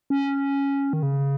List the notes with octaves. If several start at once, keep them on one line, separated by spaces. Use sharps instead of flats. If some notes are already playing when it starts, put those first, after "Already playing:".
C#4
D#3
C#3